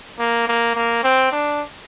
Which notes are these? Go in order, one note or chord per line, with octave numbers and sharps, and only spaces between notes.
A#3
A#3
A#3
C4
D4